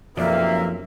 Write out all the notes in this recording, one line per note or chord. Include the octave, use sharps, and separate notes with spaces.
B1 F#2 C3 F3 A#3 D5 E5